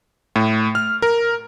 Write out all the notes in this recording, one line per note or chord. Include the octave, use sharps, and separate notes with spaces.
A2
F6
A#4